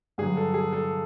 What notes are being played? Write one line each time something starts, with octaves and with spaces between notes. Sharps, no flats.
G2 D3 F#3 G#4
A4
G#4
A4